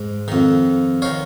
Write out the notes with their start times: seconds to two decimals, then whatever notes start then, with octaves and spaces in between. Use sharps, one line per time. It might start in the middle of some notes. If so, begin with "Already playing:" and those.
Already playing: G#2
0.28 F2 D#3
1.02 D#3 C#5 F5